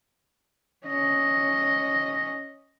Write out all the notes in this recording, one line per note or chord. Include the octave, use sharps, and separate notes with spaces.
C#4 D#5